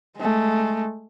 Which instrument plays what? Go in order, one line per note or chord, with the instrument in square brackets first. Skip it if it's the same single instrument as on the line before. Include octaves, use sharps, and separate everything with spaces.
[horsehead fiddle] G#3 A3